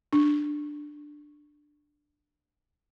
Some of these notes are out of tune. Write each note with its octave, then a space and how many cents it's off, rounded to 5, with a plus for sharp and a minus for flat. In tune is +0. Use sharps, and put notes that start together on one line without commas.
D4 +10